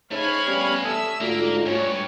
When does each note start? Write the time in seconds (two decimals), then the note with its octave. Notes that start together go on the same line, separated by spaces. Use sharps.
0.11 C#3 A3 D#4 C5 C#5 F5 G#5 B5
0.47 G3 B3 C#4
0.85 A4 E5 D#6 E6
1.21 G#2 D3 A3 A#3 F4 F#4
1.66 G2 C#4 C#5